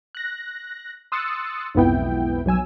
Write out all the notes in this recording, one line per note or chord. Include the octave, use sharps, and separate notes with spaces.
F#6 A#6
C6 D#6 E6 F#6 A6 C#7
B1 F2 G#2 B3 E4 G5
B1 F#3 G#5 E6